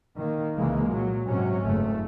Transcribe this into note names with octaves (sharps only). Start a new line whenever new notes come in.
D#3 A#3
C2 C#3 E3 G#3 A#3
A#2 F#3
G#2 C3 F#3 C#4
F#1 A3